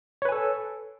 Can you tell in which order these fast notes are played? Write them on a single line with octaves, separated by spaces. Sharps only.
C#5 B4 G#5 A4